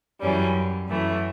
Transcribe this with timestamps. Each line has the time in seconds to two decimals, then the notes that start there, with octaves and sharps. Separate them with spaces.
0.21 F#2 E3 G3 C#4
0.88 F#2 E3 A3